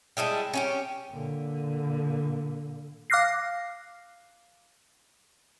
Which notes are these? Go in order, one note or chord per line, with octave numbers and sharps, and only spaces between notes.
G3 G#3 E4 A4
C#4 E4 G4
A#2 D3
F5 D6 F6 F#6 A#6 C7